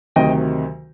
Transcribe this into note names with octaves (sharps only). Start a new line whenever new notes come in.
D2 C3 D#3 F#3 D#5 G5